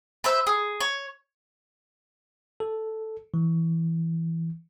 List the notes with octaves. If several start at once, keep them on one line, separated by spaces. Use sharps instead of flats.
B4 C5 E5
G#4
C#5
A4
E3